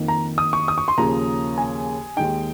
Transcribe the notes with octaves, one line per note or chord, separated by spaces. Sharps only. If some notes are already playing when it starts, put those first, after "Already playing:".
Already playing: F2 D#3 A#3 D#4
A#5
D#6
C#6
D#6
C#6
C6
D#2 C#3 F3 A#3 C#4 A#5
G#5
D#2 D#3 G#3 D#4 G5